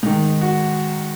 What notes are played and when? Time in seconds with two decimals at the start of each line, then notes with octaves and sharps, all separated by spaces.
0.03 G#2 D#3 D#4
0.41 F#4